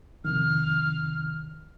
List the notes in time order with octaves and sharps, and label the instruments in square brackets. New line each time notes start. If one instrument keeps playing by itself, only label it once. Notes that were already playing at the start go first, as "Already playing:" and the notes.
[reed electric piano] F2 C3 D#3 [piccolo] F6